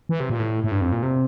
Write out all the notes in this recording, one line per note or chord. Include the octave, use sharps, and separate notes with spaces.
E3
C3
A#2
A2
A2
G2
F2
A#2
C3